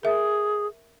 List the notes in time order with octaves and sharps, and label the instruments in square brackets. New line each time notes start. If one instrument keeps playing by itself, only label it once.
[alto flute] G#4 [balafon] A#4 E5